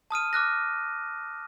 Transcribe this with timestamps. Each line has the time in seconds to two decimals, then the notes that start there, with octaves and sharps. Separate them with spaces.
0.11 A5 D#6 F6 D#7
0.33 D6 F6 F#6 A#6